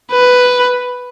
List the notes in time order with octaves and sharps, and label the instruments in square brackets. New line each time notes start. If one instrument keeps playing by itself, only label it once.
[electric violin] B4